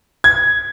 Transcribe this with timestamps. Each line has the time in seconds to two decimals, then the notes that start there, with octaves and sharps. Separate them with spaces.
0.24 G#6